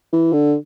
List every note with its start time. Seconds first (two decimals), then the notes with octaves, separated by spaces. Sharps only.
0.13 E3
0.33 D3